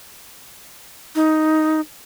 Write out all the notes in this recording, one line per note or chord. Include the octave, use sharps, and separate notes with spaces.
D#4